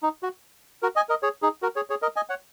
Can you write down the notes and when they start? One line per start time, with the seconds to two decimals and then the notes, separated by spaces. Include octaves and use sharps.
0.03 D#4
0.23 F#4
0.82 F#4 A#4
0.96 D#5 G#5
1.09 A#4 D#5
1.23 G#4 C#5
1.42 D#4 G#4
1.62 F#4 A#4
1.76 G#4 C#5
1.90 G#4 C#5
2.02 A#4 D#5
2.16 D#5 G#5
2.29 C#5 F#5